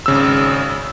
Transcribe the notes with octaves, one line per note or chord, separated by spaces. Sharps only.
G#1 C#3 E6